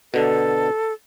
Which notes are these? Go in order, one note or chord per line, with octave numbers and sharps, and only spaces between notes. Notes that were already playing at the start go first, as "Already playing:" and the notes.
B2 D3 A4